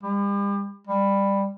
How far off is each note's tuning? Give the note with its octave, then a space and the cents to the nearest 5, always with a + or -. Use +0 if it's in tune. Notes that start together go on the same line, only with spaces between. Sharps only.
G3 +40
G3 +15